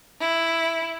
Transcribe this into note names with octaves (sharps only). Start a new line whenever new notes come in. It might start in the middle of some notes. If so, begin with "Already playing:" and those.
E4